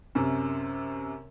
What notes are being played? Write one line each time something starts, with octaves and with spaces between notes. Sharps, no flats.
F#2 C3